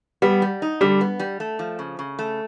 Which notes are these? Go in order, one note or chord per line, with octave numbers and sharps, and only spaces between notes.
G3 B3
G3
D#4
D3 G3
B3
G3
A3
F3
C#3
C#3
A3